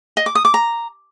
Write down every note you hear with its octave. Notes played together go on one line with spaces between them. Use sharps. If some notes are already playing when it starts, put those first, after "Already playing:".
D#5
D6
D#6
D6
A#5